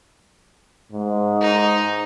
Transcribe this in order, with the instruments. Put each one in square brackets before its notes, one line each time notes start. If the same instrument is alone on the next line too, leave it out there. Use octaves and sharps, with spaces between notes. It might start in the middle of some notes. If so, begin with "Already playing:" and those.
[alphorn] G#2
[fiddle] D#4